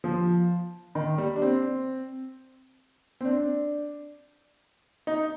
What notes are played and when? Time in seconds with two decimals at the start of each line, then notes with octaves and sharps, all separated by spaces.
0.04 F3
0.95 D#3
1.18 G3
1.36 D4
1.42 C4
3.21 C4
3.25 D4
5.07 D#4